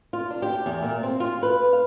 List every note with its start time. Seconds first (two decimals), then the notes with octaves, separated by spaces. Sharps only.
0.13 F4
0.30 D4
0.42 G4
0.66 E2
0.82 A#2
1.03 C4
1.20 F4
1.43 B4
1.73 F5